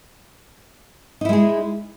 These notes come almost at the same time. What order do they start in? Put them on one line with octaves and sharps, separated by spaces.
D#4 E4 G#3 G#4